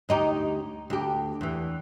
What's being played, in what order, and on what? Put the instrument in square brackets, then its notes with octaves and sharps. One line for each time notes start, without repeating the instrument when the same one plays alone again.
[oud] D2 D#4 G4
D2 G4
E2 E3